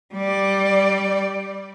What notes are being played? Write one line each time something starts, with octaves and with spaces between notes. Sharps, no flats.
G3 D5